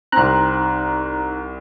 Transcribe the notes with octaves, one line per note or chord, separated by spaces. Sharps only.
C2 C4 D#4 A#5 F#6